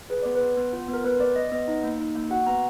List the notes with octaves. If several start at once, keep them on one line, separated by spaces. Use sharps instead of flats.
G#4 B4
B3 D5
B4
B3
B3
F4
B3
A#4
B3 B4
B3 D5
B3 D#5
B3 D#5
D#4
A#3
D#4
A#3
F#4 F#5
B3 A#5